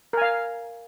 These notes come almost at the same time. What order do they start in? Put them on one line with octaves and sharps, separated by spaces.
A#4 G#5 F5